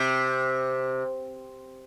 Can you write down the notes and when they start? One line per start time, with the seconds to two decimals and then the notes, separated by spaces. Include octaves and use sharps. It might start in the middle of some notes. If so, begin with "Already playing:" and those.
Already playing: C3